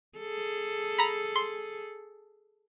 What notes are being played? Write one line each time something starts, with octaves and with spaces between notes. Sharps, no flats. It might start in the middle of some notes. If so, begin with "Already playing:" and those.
G#4 A4
A#5 B5
C6